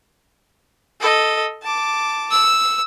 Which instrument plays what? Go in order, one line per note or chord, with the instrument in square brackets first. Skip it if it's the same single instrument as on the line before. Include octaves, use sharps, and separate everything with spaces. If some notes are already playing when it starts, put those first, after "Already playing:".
[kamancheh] A4 D#5
A5 D6
[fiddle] E6